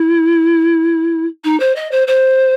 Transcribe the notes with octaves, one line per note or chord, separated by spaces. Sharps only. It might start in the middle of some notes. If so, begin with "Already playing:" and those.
Already playing: E4
D#4
C5
D#5
C5
C5